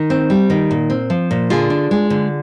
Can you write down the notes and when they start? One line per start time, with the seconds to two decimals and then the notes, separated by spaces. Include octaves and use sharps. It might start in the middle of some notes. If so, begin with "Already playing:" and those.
Already playing: D#3
0.10 C4
0.30 G3
0.50 D#3
0.71 A#2
0.90 C4
1.10 F3
1.31 A#2
1.50 D3 F4 G#4
1.70 D4
1.91 G#3
2.10 D3